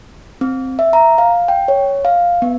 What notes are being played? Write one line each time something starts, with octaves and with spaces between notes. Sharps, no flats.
C4
E5
A#5
F5
G5
C#5
F5
B3